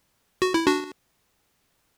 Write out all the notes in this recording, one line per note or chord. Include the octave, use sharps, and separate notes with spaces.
F#4
E4
D4 F#4